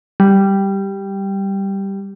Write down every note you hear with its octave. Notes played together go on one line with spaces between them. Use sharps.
G3